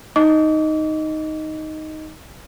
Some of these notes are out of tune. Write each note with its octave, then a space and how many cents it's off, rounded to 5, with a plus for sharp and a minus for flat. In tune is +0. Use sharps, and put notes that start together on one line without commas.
D#4 +0 D#5 +0 D6 -35